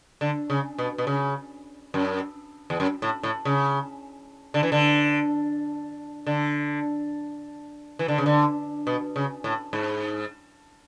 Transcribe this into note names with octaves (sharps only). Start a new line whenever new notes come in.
D3
C#3
B2
B2
C#3
F#2
E2
F#2
A2
A2
C#3
D3
E3
D3
D3
E3
D3
C#3
D3
B2
C#3
A2
G#2